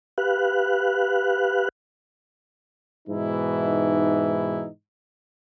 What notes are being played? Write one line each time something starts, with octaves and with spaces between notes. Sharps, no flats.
G4 B4 F5 F#6
G#2 B2 E3 D#4 E4